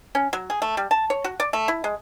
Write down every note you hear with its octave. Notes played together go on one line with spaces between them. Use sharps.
C#4
F#3
G#4
A3
G3
A5
C#5
F#4
D5
A3
E4
G#3